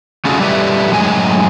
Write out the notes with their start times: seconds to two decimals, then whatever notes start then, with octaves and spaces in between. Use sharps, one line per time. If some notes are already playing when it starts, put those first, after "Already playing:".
0.25 A3 C#4 F4 F#4 G#4 A4
0.39 G3 G4 A4 B4 E5
0.91 F#2 A2 G#3 G#5